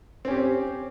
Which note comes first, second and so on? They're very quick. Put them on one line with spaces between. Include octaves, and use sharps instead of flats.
C4 C#4 G4